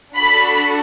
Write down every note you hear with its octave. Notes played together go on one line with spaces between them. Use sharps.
D4 F#4 A4 B5